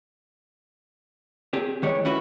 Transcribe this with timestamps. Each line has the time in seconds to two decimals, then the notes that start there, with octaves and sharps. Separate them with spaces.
1.53 C4 G4 G#4
1.83 D#3 E3 G#3 G4 C#5
2.05 C#4 E4 F#4 B4